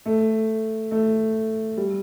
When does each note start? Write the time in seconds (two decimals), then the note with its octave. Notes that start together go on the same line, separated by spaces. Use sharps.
0.06 A3
0.91 A3
1.77 G3